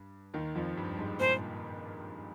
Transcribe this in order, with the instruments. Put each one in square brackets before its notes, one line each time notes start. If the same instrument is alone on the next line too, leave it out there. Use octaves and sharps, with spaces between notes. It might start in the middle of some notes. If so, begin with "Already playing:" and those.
Already playing: [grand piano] G2
D#2 D#3
F2 F3
G2 G3
G#2 G#3
[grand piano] A#2 A#3 [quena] C5